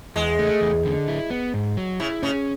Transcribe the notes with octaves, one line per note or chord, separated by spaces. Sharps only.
E2 G#3
A3
E2
D3
E4
B3
G#2
F#3
C#3 E4
C#3 C#4